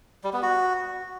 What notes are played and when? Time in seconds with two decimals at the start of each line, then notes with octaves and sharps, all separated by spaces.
0.24 G3
0.33 B3
0.43 F#4